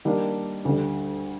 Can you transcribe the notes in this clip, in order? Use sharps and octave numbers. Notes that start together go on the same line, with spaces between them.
D#3 G3 A#3 D4
D2 D3 G3